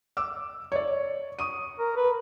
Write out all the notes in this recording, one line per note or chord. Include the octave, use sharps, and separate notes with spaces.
D6 E6
C#5 D5
C#6 D#6 D#7
A#4
B4